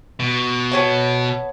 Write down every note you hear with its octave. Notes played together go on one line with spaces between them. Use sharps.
B2
B3 C#5 A5